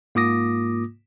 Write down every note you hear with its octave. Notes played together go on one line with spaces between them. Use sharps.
G#2 A#3 F4 D6 D#6 A#6